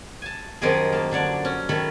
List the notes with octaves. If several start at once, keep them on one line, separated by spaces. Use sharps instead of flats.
G#5 A5
F#2 D#3 F3 D#4 G4 G#4
A#3 A5
D3 D4 C#5 D5
C#4
D#3 A3 A4 C#5 B5